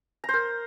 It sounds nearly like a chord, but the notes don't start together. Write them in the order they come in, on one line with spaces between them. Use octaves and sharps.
A#5 C5 A#4